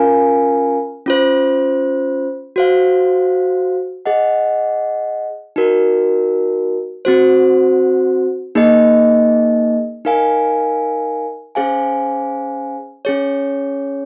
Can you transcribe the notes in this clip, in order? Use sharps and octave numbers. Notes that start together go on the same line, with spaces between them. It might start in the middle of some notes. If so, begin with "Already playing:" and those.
Already playing: C#4 F4 A#4 F5 G#5
C#4 F4 C5
F#4 C5 F5
G#4 D#5 F#5
D#4 F#4 A#4
C4 F#4 C5
A#3 D#4 G#4 D#5
D#4 A#4 F5 G#5
C#4 G#4 C5 F5 G#5
C#4 G#4 C#5